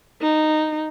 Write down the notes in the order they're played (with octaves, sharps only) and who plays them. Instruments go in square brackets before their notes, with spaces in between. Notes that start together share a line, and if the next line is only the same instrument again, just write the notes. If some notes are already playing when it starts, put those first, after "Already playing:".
[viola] D#4